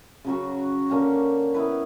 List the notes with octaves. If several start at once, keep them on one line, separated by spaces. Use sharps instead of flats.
C#3 F#3 C#4 F#4
D3 A#3 C#4 G4
B3 E4 B4